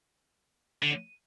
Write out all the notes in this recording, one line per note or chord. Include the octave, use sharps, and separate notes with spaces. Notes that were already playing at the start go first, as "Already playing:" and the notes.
D3